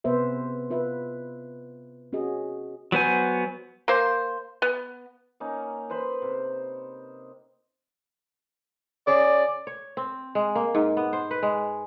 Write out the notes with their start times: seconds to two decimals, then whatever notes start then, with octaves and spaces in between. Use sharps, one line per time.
0.04 C3 B3 B4 C5 E5
0.70 F4 B4 E5
2.13 C#4 F#4 G#4 D#5
2.92 F#3 B3 C5 G#5
3.88 A#3 C5
4.62 B3
5.40 A#3 C#4 D#4
5.90 B4 C5 B5 C6
6.22 C3
9.07 C#3 D5
9.67 C#5
9.97 C4
10.35 G#3
10.55 A#3
10.75 G#2
10.97 B3
11.13 C5
11.31 B4
11.42 G#3